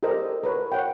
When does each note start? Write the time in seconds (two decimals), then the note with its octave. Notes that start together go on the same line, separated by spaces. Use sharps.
0.03 G4 A4 A#4 C5 D#5
0.43 A#4 B4 C#5
0.72 C#5 F#5 G5